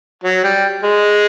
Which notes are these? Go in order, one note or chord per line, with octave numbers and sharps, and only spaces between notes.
F#3
G3
G#3